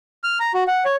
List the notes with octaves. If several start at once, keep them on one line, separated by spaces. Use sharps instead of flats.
F6
A#5
F#4
F#5
C#5